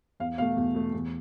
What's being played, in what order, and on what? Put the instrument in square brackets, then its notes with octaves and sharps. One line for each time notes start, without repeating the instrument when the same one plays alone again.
[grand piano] E2 F5
B2 A3 F5
E2
B2 A3
E2